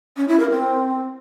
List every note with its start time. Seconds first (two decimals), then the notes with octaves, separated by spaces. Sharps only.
0.17 C#4
0.28 E4
0.40 A#4
0.51 C4